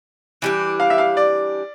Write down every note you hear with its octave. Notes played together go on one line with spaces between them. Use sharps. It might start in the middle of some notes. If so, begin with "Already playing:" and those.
E3 G3 D4
F5
E5
F5
D5